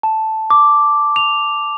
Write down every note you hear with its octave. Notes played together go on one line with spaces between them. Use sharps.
A5
D6
F7